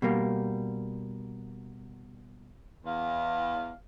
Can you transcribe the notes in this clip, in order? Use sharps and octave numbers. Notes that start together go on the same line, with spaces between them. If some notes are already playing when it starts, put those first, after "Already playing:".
B2 G3 A#3
E2 F5